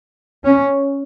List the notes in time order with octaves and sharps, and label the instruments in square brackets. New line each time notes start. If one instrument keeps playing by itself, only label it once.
[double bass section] C#4